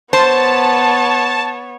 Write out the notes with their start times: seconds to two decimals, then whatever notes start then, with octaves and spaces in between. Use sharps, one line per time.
0.13 B3 C5 C#5 A5